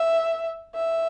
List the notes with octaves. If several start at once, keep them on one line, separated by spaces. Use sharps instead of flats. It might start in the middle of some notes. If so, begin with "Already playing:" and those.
Already playing: E5
E5